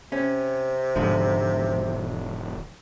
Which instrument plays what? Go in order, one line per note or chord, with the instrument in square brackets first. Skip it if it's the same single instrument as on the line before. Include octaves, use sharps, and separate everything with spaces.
[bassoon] C3 [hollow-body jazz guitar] C#4
[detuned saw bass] E1 [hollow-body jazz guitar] G#2 D3 F3